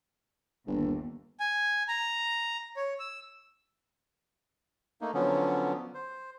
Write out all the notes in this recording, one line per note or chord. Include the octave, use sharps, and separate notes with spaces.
G1 D#2
G#5
A#5
C#5
E6
A3 A#3 D#4
D3 F3 F#3 B3 C#4
C5